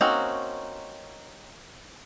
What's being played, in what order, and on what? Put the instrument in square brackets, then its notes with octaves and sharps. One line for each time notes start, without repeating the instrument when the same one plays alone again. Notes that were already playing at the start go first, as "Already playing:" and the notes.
[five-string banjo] A#3 C4 C#4 D#4 F#4